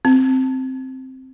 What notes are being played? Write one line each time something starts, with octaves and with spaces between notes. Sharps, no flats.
C4